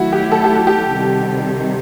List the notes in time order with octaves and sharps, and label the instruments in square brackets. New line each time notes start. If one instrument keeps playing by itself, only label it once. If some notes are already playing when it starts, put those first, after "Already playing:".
Already playing: [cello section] D#3 F#3 A3 E4 [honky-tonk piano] F#4
[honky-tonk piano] G4
A4
G4
F#4
G4
[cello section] C3 D#3 G3